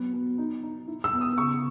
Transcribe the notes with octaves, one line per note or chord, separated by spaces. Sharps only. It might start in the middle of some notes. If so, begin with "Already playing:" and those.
Already playing: F#3 B3
B3
D#4
D#4
E4
E6
B3
D#6
C#3 C#6